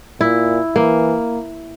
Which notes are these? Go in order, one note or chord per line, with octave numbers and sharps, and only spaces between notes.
A#2 E4
E3 A#3